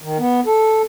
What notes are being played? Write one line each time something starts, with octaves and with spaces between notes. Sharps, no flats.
D#3
B3
A4